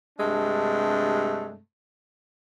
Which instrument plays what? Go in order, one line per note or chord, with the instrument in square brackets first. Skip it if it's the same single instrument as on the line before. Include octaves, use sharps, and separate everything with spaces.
[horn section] G2 C3 G#3 A3 D4